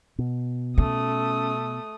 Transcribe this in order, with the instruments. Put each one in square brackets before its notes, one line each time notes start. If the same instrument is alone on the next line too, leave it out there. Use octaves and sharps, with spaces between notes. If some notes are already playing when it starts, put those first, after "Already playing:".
[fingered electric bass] B2
[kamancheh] A3 D#6 [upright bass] C#4